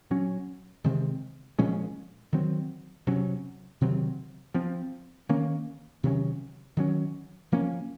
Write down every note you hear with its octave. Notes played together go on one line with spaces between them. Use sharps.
A#2 F#3 C#4
C3 D#3 G#3 C4
A#2 F3 G#3 C#4
D#3 F#3 C4
C3 F#3 C#4
C3 D#3 F#3 C4
F3 C4
D#3 A#3 C#4
C3 D#3 F#3 C#4
D#3 F#3 C#4
F3 A#3 C#4